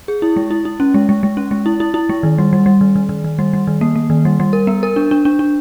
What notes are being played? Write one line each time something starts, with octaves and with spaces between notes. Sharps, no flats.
G#4
E4
G#3
E4
E4
C#4
G#3
G#3
G#3
C#4
G#3
E4
E4
E4
G#3
D#3
G3
G3
G3
D#3
D#3
D#3
D#3
G3
G3
D#3
A#3
A#3
D#3
G3
G3
A#4
B3
A#4
D4
D4
D4
D4